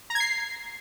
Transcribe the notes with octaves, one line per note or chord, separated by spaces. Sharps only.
A#5
G#6
C7